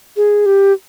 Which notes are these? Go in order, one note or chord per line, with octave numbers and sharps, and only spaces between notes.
G#4
G4